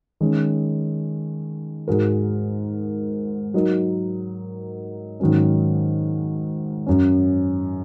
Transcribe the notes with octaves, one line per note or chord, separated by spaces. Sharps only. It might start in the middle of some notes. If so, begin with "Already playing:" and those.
D#3 G#3 C#4
G#2 G#3 F#4 A#4
F#3 D#4 A#4
G#2 D#3 F#3 C#4
F#2 F#3 C#4